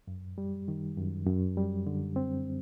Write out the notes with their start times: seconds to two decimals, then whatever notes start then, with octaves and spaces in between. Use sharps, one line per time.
0.08 F#2
0.38 G3
0.68 D#3
0.97 F#2
1.26 F#2
1.57 G3
1.87 D3
2.16 C4